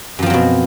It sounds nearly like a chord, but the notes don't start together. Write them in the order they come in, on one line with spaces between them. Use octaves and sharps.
F#2 F3 C4 F#3 B2